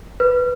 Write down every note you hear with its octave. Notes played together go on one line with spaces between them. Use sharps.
B4